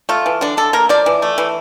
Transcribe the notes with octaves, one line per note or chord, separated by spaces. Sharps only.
A3 F4
E3
D3 D4
D3 A4
A#3 A#4
F3 D5
E3
A3
E3